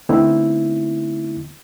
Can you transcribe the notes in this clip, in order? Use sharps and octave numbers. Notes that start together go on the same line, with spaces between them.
D3 A3 B3 C4 D#4 E4